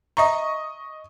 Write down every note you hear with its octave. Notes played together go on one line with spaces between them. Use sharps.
D#5 E5 A#5 C#6